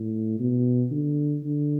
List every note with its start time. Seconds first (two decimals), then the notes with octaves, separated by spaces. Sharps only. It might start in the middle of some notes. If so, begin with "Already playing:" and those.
Already playing: A2
0.40 B2
0.91 D3
1.44 D3